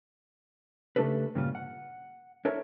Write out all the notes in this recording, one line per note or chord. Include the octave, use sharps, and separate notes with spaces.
C#3 A3 D4 G4 A4 B4
G2 A#2 C#3 G3 F4
F#5
D4 E4 A4 A#4 C#5